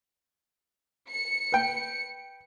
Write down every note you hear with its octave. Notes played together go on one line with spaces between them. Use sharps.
C#7
B4 G5